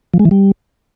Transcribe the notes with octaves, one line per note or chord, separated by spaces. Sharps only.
F3
G#3
E3
G3